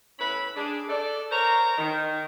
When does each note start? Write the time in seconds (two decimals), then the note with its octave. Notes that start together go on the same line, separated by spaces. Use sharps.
0.19 A2 C#4 E4 B4 B5
0.56 D4 G#4
0.88 A4 D5
1.31 A#4 C5 C#5 A#5
1.78 D#3